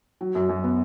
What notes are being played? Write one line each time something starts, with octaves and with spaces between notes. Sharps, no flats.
F#3
F#2
F#2
B3